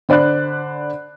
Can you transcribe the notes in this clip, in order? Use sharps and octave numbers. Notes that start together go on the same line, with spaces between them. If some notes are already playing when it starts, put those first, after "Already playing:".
D3 C5 D5 B5 F#6